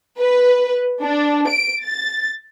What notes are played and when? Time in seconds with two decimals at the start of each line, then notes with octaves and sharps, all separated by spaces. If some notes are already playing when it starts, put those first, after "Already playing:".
0.18 B4
1.02 D4
1.48 D7
1.83 A6